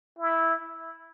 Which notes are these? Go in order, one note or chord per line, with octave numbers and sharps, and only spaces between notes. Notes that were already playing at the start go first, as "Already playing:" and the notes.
E4